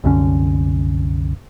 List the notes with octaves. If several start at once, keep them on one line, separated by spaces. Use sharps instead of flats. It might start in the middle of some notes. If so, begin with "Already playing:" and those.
C2 F#2 D3 C#4